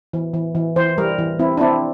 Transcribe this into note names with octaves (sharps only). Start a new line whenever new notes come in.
E3
E3
E3
E3 C5
G3 A#4
E3
C4 E4
D4
C4 E4